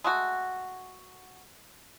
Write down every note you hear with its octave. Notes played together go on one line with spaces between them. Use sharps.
G#3 A3 F#4